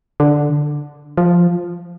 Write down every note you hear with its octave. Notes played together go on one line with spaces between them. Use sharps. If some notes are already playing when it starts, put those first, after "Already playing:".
D3
F3